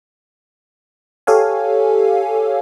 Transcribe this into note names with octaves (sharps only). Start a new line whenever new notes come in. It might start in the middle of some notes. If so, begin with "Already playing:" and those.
G4 A4 C#5 F5 G#5